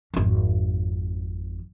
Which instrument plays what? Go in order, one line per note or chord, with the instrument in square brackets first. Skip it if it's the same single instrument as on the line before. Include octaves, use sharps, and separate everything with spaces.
[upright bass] G#1 F2